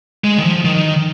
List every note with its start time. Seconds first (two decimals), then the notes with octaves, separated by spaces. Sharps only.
0.24 G#3
0.38 D#3
0.44 F3
0.65 D#3